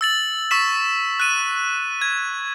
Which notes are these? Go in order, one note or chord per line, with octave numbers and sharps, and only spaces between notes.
E6 A6 F#7
C#6 E6 B6 E7
F#6 D#7
G#6